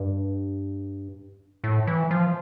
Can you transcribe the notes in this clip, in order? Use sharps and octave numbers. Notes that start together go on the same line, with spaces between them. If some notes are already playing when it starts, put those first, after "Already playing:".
Already playing: G2
A2
E3
F3